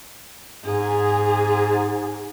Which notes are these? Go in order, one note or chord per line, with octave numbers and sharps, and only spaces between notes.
G#2 G#4